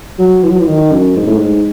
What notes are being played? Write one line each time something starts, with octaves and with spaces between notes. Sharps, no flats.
F#3
E3
F#3
E3
D#3
F#2
G#2
A2
G#2